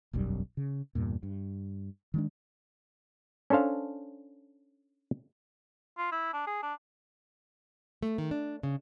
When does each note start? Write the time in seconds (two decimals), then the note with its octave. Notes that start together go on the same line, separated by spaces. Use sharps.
0.13 E1 B1 F#2 G3
0.57 C#3
0.95 E2 G2 A#2
1.23 G2
2.14 D#3 G#3 D4
3.50 C#4 D4 A4 C5 F5
5.98 F4
6.12 E4
6.33 D4
6.47 G#4
6.63 D4
8.03 A3
8.18 D#3
8.31 D4
8.63 C#3